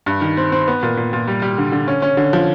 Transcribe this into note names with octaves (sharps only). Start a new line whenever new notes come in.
G2
D#3
C4
C4
B3
A#2
A#2
A#2
G3
G3
D3
D3
C#4
C#4
D3
F3